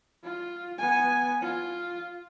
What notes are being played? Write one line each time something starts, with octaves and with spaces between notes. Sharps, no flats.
F4
B3 G#5
F4